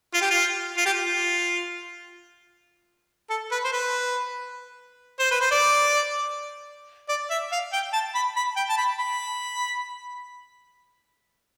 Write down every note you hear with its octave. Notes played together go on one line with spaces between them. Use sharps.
F4
G4
F4
F4
G4
F4
A4
B4
C5
B4
C5
B4
C5
D5
D5
E5
F5
G5
A5
B5
B5
G5
A5
B5
B5